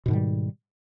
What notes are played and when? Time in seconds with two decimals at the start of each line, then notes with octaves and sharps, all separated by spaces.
0.06 B2
0.08 G#2
0.11 D#3
0.13 G3